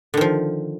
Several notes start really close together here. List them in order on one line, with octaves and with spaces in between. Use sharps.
D3 D#3 F3